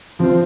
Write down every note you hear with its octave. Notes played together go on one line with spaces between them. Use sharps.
F3 C4 F4 C5